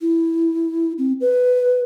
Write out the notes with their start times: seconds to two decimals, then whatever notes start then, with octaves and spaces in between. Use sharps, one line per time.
0.01 E4
0.98 C4
1.21 B4